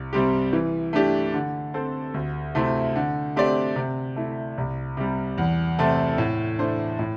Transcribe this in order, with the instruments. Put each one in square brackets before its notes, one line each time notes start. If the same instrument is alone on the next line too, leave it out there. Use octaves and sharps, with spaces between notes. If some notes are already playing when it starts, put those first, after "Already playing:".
Already playing: [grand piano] C2
C3 G3 C4 G4
E3
A3 D4 G4
D3
C4 A4 C5
D2
C3 A3 C4 E4
D3
A3 C4 G4 D5
C3
A3 E4
C2
C3 G3
E2
C3 A3 C4 A4
A2
A3 D4 C5
A2